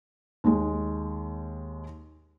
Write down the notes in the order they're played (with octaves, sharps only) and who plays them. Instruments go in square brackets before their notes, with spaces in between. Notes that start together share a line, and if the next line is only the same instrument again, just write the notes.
[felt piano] D#2 D#3 G#3